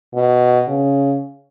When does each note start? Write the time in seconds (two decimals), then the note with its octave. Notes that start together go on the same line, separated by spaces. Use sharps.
0.15 B2
0.68 C#3